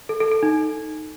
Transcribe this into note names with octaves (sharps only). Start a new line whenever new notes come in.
A4
A4
A4
D#4